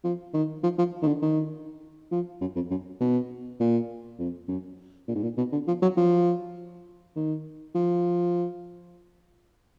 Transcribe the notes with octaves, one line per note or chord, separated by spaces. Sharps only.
F3
D#3
F3
F3
D#3
D3
D#3
F3
F#2
F2
F#2
B2
A#2
F2
F#2
A#2
G#2
A#2
B2
D3
F3
F#3
F3
D#3
F3